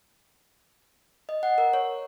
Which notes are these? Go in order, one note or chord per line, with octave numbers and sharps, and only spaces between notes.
D#5
F#5
A#4
C#5